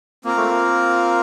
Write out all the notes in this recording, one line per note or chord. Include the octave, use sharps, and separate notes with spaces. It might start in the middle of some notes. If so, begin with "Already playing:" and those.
A#3 C4 F4 A#4
A3
A#3